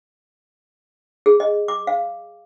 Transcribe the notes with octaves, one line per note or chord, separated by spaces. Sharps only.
G#4
D#5
D6
F5